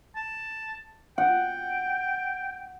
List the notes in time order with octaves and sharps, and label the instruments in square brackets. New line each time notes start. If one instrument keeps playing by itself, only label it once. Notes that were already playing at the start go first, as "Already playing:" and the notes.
[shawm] A5
[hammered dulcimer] F#5 [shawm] G5